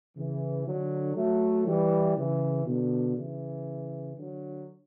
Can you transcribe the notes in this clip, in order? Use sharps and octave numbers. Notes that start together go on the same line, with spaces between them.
C#3 E3
D3 F#3
F#3 A3
E3 G3
C#3 E3
B2 D3
C#3 E3
D3 F#3